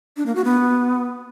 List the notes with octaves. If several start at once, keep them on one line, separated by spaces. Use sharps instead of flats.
D4
A#3
F#4
B3